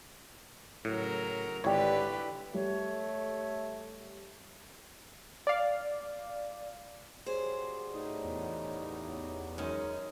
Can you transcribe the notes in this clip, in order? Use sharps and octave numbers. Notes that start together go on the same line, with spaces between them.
A2 C#3 F#3 A#4
G#1 D3 G3 E4 G4 B4 C#5
G3 A3 C#5
D5 F5
C#3 F#3 G3 G#4 C5
A2 D#4
E2
F#2 D#3 G#3 C#4 D#4